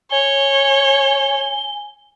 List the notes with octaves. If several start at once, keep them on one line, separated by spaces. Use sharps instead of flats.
C#5 G#5 G7